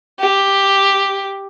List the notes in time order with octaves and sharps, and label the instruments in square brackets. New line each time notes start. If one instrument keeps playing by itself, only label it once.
[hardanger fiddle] G4